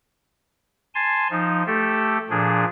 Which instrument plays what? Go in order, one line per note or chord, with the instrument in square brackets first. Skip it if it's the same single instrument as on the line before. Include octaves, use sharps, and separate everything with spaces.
[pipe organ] G#5 A5 C6
F3 D#4
A3 G4 A4
A#2 F3 D4 G#4